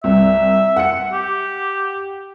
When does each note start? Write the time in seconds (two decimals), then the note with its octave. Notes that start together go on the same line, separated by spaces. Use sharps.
0.04 C2 E5
0.76 F#5 C#7
1.13 G4